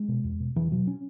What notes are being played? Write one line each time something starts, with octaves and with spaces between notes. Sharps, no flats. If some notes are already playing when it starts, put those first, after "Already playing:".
Already playing: G#3
B2
E2
B2
E2 E3
B2 F#3
C#4